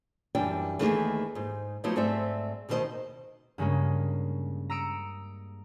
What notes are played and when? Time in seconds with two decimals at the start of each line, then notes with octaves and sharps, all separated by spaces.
0.35 F#2 E3 G3 D4 G5
0.79 D#2 E3 A3 A#3 D#4 G#4
1.35 G#2 D#4
1.84 F3 F#3 A3 B3 D#4 E4
1.96 G#2 A3 C4 D5 E5
2.69 D2 B2 D#3 D4 C5 D#5
3.58 G2 C#3 G#3 A#3 C#4
4.70 A#5 D#6 E6 C#7 D7